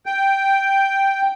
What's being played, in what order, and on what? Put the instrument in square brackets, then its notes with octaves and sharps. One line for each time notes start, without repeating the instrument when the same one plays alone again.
[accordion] G5